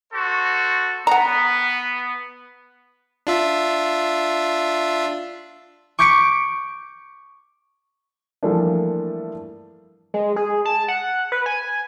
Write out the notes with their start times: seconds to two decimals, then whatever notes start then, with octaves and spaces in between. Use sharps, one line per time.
0.13 F#4 A4 C5
1.07 B3 F#5 A#5
3.27 D4 F4 E5
5.99 C#6 D6 G6 B6 C#7 D7
8.43 E3 F3 G3 A3 A#3 D4
10.14 G#3
10.36 G#4
10.65 A5
10.88 F#5
11.32 B4
11.46 G#5